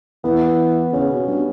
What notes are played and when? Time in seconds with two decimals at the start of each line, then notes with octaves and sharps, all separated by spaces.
0.24 E3 B3
0.92 C#3 C#4
1.11 B2
1.27 G2